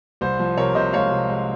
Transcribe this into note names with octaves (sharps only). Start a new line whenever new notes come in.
C2 C5
F3
C3 A#4 C#5
C3 C5 D#5
G#3 C#5 F5
C3
G#3